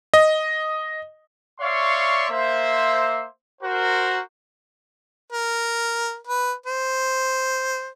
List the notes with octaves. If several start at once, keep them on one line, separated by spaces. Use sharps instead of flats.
D#5
C#5 D5 E5 F5 C6 C#6
A#3 C5 E5
F#4 A#4 C5
A#4
B4
C5